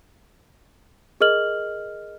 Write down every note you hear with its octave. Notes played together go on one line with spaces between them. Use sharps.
G#4 A#4 D#5 F6 F#7